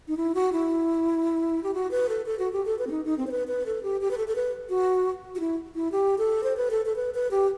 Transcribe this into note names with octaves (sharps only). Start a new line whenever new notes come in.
D#4
E4
F#4
E4
G4
F#4
B4
A4
A4
F#4
G4
A4
B4
C4
D#4
D#4
C4
C5
B4
B4
A4
G4
G4
B4
A4
A4
B4
F#4
F#4
E4
E4
G4
A4
C5
B4
A4
A4
B4
B4
G4